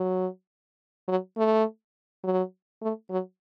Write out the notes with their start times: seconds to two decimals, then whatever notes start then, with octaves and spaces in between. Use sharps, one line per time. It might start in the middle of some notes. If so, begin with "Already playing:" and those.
Already playing: F#3
1.08 F#3
1.37 A3
2.24 F#3
2.82 A3
3.11 F#3